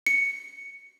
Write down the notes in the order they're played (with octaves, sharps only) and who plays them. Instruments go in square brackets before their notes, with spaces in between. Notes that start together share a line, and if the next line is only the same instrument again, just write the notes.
[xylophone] C#7